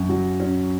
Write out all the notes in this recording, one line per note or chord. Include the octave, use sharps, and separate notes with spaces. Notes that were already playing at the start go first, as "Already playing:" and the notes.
Already playing: F#2
F#3
C#4